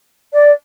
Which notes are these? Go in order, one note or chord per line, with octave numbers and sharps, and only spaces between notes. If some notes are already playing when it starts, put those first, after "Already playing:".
D5